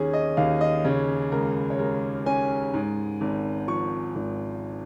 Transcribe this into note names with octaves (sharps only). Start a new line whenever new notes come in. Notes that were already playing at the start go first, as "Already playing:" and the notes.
Already playing: D#2 D#3 C#4 G#4
D#5
D#2 F5
D#5
C#3 C#5
C#2 A#4
C#5
G#3 A#4
C#4 G#5
G#2
G#1
F3 C#6
G#1